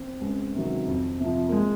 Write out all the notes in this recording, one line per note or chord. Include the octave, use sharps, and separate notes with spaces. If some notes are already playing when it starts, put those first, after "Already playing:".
Already playing: C4
C#2
C3 D#3 F#3
F2
C3
F3
A#3
G#3